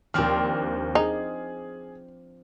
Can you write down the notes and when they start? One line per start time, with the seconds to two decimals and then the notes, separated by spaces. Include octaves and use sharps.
0.14 D#2 F3 C4 D4 F6
0.95 D#4 G#4